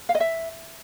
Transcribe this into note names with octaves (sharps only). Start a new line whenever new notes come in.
F5
D#5
E5